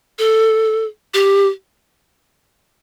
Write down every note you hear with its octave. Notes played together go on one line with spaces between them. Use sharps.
A4
G4